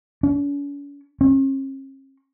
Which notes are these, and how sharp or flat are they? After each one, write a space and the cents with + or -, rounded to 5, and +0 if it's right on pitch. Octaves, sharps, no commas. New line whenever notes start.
C#4 +45
C#4 -45